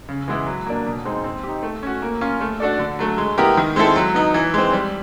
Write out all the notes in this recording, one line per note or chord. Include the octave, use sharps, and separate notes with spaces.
C#3
E3 G#3 B3 E4
F#3
A#3 D4
B2
G#3 C4 D#4
C4
D#4 G4
A3
C#4 F#4
A#3
C#4 F4
A3
D4 F#4 A4 D5
D3
F#3 A3
G#3
B3 E4 G4 A#4
D#3
G#3 C4 E4 A4
F#3
B3 D#4
E3
G#3 C4
G3